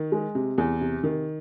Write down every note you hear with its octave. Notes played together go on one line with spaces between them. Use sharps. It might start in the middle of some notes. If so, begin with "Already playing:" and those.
Already playing: D#3
G#3
C3
E2
C3
D#3